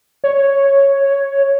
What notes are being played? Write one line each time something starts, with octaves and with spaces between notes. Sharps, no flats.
C#5